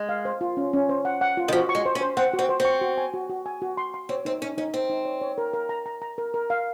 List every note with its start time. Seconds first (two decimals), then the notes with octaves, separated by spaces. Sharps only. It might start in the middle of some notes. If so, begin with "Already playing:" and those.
Already playing: G#3
0.09 F5
0.25 C5
0.41 F4
0.57 C#4
0.73 C#4
0.89 C5
1.05 F#5
1.21 F#5
1.37 F4
1.48 D#3
1.53 F3 F#4
1.69 C#6
1.75 G#3
1.86 C5
1.95 C#4
2.01 C5
2.17 C4 F#5
2.33 F#4
2.39 C4
2.49 C5
2.60 C4
2.65 C#6
2.81 F#4
2.98 G#5
3.14 F#4
3.29 F#4
3.46 G#5
3.62 F#4
3.77 C6
3.94 C6
4.09 C4 C#5
4.25 C4 D#4
4.42 C#4 D#4
4.58 C#4 D#4
4.74 C4 D#4
4.90 D#4
5.05 C#5
5.22 C#5
5.38 A#4
5.54 A#4
5.69 A#5
5.86 A#5
6.02 A#5
6.18 A#4
6.34 A#4
6.50 F5